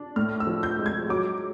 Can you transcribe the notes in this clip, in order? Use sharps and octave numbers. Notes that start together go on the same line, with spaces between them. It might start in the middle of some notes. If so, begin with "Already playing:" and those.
Already playing: D4
A2 F6
E6
F3
G6
G#3
G#6
F#3 D6